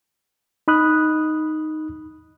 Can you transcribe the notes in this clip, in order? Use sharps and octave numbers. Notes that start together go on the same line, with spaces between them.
D#4 B5 D#6 F#6